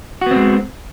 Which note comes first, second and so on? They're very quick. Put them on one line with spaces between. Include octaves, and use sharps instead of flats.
F#4 B3 C4 G#3